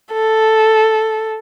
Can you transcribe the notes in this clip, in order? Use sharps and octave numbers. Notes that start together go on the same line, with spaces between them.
A4